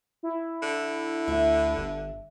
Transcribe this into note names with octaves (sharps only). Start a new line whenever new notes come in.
E4
D3
D2 E5
G1